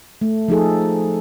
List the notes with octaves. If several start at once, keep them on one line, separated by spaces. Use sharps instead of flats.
A3
F3 D#4 G#4 A4